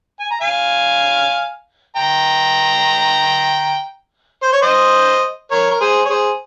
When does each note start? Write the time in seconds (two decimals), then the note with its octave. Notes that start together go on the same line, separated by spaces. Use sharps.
0.19 G#5
0.30 A#5
0.41 F5 G#5
1.96 G5 A#5
4.43 C5
4.53 C#5
4.62 C5 D#5
5.51 A#4 C#5
5.71 A#4
5.80 G#4 C5
6.05 C#5
6.10 G#4 C5